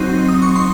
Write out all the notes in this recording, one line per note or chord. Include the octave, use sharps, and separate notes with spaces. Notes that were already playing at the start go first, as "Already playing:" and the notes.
Already playing: F#3 C4 D#4 C6
D#6
C#6
C6